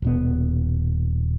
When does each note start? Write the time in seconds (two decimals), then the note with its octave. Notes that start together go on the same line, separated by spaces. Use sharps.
0.02 D#1 B2 B3